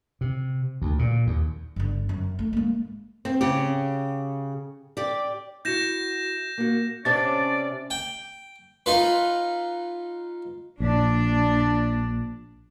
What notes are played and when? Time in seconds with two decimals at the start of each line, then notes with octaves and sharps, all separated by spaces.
0.21 C3
0.82 D2
0.99 A#2
1.27 D#2
1.76 G1 D3
2.09 F#2
2.39 A3
2.53 G#3 A#3
3.25 C4
3.41 C#3 G4
4.97 G4 D5
5.65 E4 F#4 G6 A#6 E7
6.58 A#3 F#4
7.05 C3 C#4 D4 D5 A6
7.90 G5
8.86 D#4 F4 B4
10.80 A#1 D4